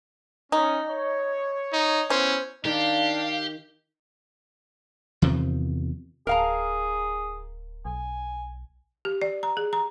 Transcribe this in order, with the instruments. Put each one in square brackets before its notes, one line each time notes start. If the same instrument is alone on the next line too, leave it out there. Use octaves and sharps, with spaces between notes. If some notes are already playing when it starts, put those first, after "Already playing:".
[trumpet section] C#4 [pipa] D#4
[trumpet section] C#5
[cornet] D#4
[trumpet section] B3 E4 [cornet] C#4 [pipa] C5
[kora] D#3 [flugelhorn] D4 [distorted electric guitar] G4 [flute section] F5
[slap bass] E2 C3 D#3 F3
[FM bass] D1 [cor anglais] G#4 [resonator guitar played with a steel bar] A#4 F5 A#5
[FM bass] B1 [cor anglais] G#5
[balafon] G4
D5
A#5
G#4
A#5